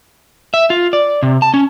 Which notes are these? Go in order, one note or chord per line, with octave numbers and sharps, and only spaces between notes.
E5
F4
D5
C3
A5
C#4